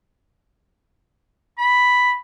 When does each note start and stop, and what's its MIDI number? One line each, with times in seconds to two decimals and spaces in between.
1.58 2.14 83